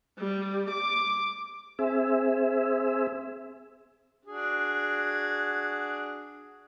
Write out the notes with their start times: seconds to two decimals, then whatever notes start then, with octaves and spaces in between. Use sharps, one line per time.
0.19 G3
0.70 D6
1.79 C4 G#4 E5
4.25 D4 F#4 G#4